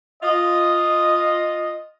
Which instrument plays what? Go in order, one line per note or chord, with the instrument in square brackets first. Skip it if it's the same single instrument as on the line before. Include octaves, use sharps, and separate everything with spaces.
[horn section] F4 D#5